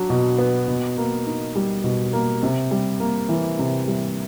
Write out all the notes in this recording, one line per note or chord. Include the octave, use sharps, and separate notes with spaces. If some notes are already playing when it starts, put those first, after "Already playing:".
Already playing: F#3 D4
B2
B3
B2
A#3
D#4
G3
B2
A#3
C3
G3
A#3
E3
C3
G3